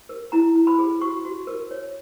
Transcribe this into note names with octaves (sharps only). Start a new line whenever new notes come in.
A#4
E4 A#5
E4
B5
G#4
F#4 C#6
F#4
A#4
C#5